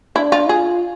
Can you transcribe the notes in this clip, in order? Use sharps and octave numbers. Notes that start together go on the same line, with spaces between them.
D4 E4
F4
F4 G#4